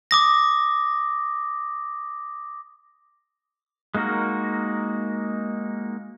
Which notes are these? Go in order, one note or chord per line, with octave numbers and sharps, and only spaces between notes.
D6 D#6 A#6
G#3 A#3 D#4 F#4 A#4